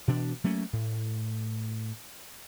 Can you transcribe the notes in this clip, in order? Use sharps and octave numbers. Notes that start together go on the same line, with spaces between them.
B2 E3 D4
F#3 A3 A#3 C#4
A2